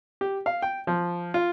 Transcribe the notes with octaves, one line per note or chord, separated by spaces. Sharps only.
G4
F5
G5
F3
F4